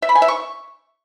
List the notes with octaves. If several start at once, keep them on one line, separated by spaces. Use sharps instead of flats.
E5
B5
G#5
E5
C#6